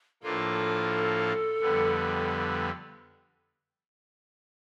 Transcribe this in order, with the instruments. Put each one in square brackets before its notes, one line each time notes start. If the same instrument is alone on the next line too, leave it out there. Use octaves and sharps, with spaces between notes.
[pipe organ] A2 F3 A#3 D4 F4 [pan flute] A4
[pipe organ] F2 D3 G3 B3